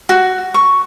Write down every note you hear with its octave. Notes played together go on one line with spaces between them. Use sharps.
F#4
C#6